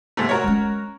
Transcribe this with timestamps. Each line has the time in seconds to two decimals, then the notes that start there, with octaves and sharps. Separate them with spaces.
0.17 G#2 C3 A3
0.29 F#4 A#4 C#5
0.44 G#3 C#4